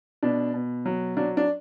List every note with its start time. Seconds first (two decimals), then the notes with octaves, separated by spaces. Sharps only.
0.23 B2 D4
0.54 B2
0.86 F#3
1.17 F#3 D4
1.37 D4